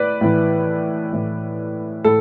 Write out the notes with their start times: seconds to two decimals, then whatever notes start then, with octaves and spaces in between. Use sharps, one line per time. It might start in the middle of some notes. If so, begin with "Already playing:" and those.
Already playing: A2 B4 D5
0.21 A2 E3
1.13 A2 E3
2.04 A2 A4